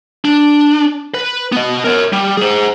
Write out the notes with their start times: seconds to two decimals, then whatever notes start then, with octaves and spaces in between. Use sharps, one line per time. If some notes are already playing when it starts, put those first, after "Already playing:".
0.25 D4
1.14 B4
1.52 B3 D#5
1.84 A#4 C#5
2.13 G3
2.37 G#4 C5